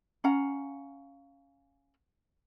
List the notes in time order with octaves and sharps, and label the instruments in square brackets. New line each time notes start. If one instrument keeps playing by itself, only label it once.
[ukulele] C#4 F5 F#5 A#5